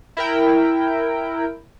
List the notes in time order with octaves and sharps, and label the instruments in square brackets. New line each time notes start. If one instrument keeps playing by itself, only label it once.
[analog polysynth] E4 A#4 G5